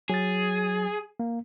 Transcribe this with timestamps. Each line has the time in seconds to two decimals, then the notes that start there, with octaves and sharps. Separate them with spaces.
0.09 F#3 G#4 A6
1.20 A#3